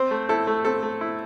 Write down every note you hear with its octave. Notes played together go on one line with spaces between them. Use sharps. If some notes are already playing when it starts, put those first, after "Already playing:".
Already playing: C4 C5
A3
E4 A4
A3
C4 A4
A3
E4